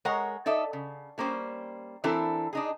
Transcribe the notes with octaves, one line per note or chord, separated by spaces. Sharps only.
G#3 A#4 C#5 F#5 A#5
D#4 A4 D5 E5
C#3
G3 A#3 C#4 C5
E3 C4 D4 E4 A4 A#4
D4 D#4 G#4